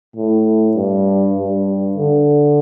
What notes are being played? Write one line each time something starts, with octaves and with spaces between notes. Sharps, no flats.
A2
G2
G2
D3